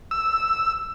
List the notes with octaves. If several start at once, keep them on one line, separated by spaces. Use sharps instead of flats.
E6